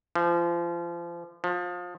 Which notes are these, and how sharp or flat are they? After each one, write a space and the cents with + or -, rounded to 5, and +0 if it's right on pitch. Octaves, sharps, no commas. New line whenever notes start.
F3 -30
F3 +25